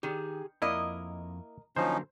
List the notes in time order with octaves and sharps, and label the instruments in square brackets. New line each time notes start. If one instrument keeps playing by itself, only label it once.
[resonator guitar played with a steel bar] D#3 [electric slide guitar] G4 G#4
[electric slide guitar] F2 [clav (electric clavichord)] A#3 E4 [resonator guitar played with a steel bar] A#4 D#5
[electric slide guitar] D3 F#3 A#3 [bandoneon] F3 C#4 D#4 [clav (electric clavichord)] C5